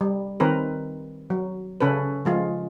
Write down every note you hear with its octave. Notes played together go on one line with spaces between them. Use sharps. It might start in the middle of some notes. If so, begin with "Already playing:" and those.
G3
D#3 C4 A#4 B4
F#3
C#3 C#4 A4 B4
F3 G#3 F4